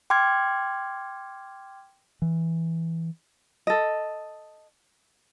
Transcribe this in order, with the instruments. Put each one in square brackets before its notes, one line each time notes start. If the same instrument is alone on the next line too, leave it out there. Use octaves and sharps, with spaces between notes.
[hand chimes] G5 C6 D6 F6 G#6
[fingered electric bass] E3
[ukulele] A4 D#5